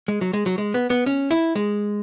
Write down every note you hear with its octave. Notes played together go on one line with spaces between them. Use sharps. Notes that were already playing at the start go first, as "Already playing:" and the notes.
G#3
F#3
G#3
F#3
G#3
B3
B3
C#4
E4
G#3